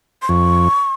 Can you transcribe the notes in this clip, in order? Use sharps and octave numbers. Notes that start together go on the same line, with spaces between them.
C6
F2 C#6